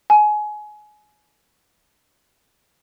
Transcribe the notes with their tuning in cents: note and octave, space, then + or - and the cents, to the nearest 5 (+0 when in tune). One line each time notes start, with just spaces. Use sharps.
G#5 +25